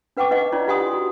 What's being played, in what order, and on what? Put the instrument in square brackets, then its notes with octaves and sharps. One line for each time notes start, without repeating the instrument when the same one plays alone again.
[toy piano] D4 B4 F#5 G5 C#6 D6
D#4 B4 D#5 F#5
D4 E4 F4 C#5 D5
F4 G4 F#5 G#5 C6 D#6
E4 F#4